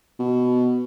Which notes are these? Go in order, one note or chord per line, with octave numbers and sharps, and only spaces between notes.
B2